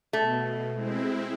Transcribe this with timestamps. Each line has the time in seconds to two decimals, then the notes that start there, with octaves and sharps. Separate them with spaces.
0.13 B2 A3
0.73 G#3 C4 E4